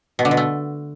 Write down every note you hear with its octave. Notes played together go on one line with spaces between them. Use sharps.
B2
D3
B2
A3